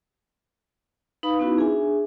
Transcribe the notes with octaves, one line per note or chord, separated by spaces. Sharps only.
D#4 B4 F5 B5 D#6
B3 C#4 D#4 E4 F#4 B4
D4 G#4 E5 G#5